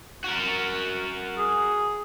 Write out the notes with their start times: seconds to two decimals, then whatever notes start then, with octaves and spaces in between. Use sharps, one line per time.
0.24 F#4 A#4
1.38 G#4